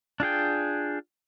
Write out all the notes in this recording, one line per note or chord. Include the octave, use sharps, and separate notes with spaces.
D4 F4 G#4 G5